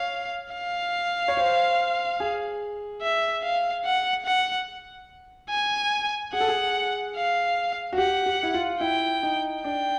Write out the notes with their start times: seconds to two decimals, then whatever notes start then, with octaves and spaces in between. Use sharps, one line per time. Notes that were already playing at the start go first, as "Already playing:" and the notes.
Already playing: C#5 F5
0.54 F5
1.28 C#5
1.37 C5
2.20 G#4
3.02 E5
3.43 F5
3.85 F#5
4.26 F#5
5.50 G#5
6.33 G#4 F#5
6.40 A4
6.48 G#4
7.16 F5
7.93 F#4
7.98 G4 F#5
8.26 G4
8.43 E4
8.54 F4
8.80 E4 G5
9.23 D#4
9.63 D4 G5